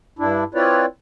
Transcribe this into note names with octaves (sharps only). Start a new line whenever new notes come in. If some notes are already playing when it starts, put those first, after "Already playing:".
G2 D4 E4
C4 E4 F4 B4 C#5 D5